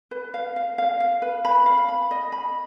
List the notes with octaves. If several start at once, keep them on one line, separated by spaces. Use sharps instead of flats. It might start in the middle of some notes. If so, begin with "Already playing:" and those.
B4
F5
F5
F5
F5
B4
B5
F5
B5
D#5
B5